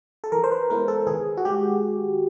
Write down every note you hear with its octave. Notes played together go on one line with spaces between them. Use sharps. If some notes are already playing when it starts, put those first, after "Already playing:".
A4
E3 A#4
C5
B4
G#3 B3 E4 A#4
A4
D#3 G#4
F#4
G#3 G4